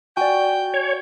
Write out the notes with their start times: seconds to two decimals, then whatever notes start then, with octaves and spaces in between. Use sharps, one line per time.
0.17 F#4 D5 G5 G#5
0.74 C#5